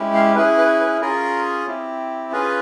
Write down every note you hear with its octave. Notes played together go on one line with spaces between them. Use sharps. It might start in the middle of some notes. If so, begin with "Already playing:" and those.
Already playing: G#3 C#4 E4 G4
F5
C#4 E4 G#4 B4
B4
B4
C#4 F4 G#4 A#4
C4 E4 G4
C#4 F4 G#4 B4